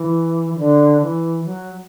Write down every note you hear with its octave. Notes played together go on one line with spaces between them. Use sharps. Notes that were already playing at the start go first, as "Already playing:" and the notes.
Already playing: E3
E3
D3
E3
F#3